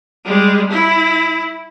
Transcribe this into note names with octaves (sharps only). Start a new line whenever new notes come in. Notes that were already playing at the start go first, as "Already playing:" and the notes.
G3 G#3
E4